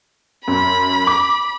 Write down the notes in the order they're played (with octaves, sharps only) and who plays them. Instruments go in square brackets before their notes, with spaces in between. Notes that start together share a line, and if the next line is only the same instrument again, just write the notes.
[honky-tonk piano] F#2 [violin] B5
[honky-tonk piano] D6